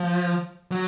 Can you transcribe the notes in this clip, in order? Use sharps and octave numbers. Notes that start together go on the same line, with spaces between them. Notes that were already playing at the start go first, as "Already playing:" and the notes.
Already playing: F3
F#3